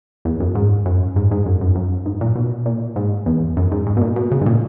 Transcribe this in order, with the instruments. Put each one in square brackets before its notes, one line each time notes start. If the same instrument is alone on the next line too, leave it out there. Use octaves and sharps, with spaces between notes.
[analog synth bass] E2
F#2
G#2
F#2
G#2
G#2
F#2
F#2
F#2
G#2
A#2
B2
A#2
G#2
E2
F#2
G#2
G#2
B2
A#2
B2
C#3
G#2
A#2